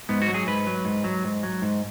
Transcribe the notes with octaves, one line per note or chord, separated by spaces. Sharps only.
G#2 B3
F#4
F#3
G#4
G#2 B4
F#3
G#2
F#3
G#2
F#3
G#2